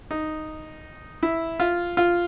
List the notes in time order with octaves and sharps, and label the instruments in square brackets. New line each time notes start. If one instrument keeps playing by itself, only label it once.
[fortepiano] D#4
E4
F4
F4